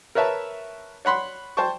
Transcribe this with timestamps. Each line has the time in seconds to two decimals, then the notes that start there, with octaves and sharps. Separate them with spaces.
0.15 A#4 B4 C#5 E5 A5
1.05 C#5 F#5 B5 C6
1.57 C5 G5 A5 C#6